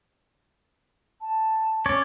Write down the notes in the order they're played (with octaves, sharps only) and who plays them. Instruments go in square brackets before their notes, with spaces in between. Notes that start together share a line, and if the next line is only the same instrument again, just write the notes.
[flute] A5
[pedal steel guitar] C#4 C#5 D5